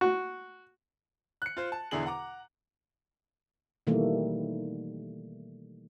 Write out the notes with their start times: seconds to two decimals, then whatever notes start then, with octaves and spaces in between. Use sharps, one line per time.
0.01 F#4
1.42 F#6 C#7
1.57 F4 C5
1.72 A5
1.91 E2 B2 D3 E4 G#4 F#7
2.06 F#5 A#5 D6
3.87 B2 D#3 E3 G3 A3 A#3